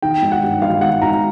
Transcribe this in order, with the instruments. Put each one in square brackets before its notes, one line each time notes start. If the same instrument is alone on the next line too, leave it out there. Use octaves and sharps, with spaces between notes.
[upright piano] D#3 G5
G#1
F#5
G2
G#1 F5
D#3 F#5
G#1 A#5